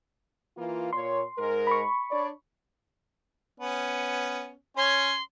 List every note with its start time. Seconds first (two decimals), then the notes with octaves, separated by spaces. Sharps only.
0.57 E3 A#3 F4
0.93 A#2 C#5 C6
1.37 G#2 G#3 A#4
1.67 B5 C#6
2.10 D4 C#5 D5
3.60 B3 C#4
4.77 C#4 C#5 C6